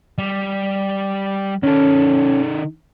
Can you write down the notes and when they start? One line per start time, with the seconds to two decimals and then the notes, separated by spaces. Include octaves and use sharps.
0.18 G3
1.63 D#3 C#4 A4